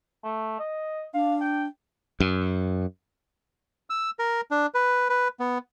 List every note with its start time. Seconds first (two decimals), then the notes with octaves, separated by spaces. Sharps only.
0.25 A3
0.59 D#5
1.14 D4 F5
1.41 G5
2.20 F#2
3.90 E6
4.19 A#4
4.51 D4
4.74 B4
5.09 B4
5.40 B3